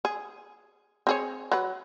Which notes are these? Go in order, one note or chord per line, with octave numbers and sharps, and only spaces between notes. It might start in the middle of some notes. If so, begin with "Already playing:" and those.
G#4
C4 G#4 C#5
F#3 B4